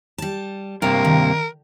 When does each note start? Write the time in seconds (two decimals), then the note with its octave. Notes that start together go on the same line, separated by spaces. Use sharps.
0.18 G3 A5
0.82 G2 C3 A#3 A#4 F5
1.05 D#3